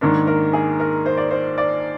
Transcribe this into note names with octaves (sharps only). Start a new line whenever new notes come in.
G#2 D#3 A#3 D4 A#4
A#4
G#4
A#4
C5
D5
C5
D5